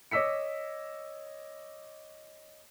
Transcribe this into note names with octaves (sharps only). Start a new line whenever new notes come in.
C#5 D#5 D6 E6 B6 C#7